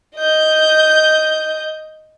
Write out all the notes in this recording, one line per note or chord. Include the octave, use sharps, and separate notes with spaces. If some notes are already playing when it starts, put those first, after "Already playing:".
D#5 G6